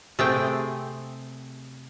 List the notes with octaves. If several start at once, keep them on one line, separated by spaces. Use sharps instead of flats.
C3 A3 C4 G#4 G5